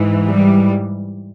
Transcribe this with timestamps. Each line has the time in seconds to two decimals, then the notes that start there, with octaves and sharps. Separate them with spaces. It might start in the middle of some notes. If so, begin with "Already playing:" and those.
Already playing: G#2 E3
0.27 G3